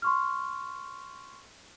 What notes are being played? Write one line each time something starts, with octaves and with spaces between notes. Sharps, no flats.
C6 C#6 F6